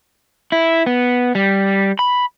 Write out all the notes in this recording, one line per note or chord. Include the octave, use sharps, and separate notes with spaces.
E4
B3
G3
B5